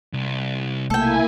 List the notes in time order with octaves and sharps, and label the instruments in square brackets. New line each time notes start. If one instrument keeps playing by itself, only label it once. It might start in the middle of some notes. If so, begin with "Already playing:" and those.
[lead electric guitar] C2
[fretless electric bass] B1 C3 A3 [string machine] A#3 E4 G#5 [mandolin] A4 G5